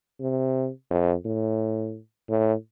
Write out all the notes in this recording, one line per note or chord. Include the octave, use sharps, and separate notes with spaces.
C3
F2
A2
A2